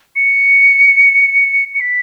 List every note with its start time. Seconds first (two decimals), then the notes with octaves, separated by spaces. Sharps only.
0.16 C#7
1.74 C#7
1.81 B6